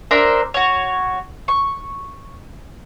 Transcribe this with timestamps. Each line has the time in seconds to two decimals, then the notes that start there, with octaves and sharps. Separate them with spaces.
0.11 D4 A#4 C5 E5
0.54 F#4 C#5
1.48 C#6